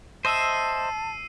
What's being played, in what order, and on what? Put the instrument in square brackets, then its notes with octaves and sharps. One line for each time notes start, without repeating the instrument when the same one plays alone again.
[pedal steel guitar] C5 D#5 E5 [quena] A5 [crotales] E6 C7 D#7